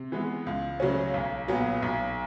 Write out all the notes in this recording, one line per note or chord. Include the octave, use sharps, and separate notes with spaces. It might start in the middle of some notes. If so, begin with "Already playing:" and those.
Already playing: C3
E3 G#3 B3
C#2
C#3 F#3 A3 C#4
B1
A#2 F#3 B3
B1